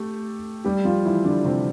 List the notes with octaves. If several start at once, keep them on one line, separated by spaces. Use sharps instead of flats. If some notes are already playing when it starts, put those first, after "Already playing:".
Already playing: A3 G4 A4
G3 G4
F3 F4
E3 E4
D3 D4
C3 C4